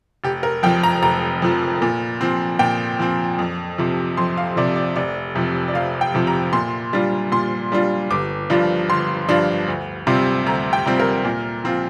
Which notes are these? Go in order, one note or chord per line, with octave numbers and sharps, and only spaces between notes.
F1 G4
A#4
F2 F3 G5
A#5
F1 A#5
F2 F3
A#2
F3 C4
A#2 G5
F3 C4
F2
C3 F3
F2 C6
F5
C3 F3 D5
D5
F1 D5
F2 C3 F3
D5
F1 F5
G5
F2 C3 F3
A#5
A#2 C6
G3 D4 F4
A#2 C6
G3 D4 F4
G1 D6
G2 F3 D4 F4
G1 C6
G2 F3 D4 F4
D2
C3 G3 C4 F4
D2 A#5
G5
C3 G3 C4 F4
A#4
A#2
F3 C4 F4